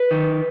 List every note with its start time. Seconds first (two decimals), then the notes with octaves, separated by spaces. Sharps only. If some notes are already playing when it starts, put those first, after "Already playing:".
Already playing: B4
0.11 D#3